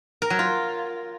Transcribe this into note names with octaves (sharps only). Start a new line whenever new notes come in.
A#4
F#3
F4